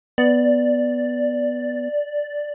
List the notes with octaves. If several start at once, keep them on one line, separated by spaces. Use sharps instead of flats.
B3 D5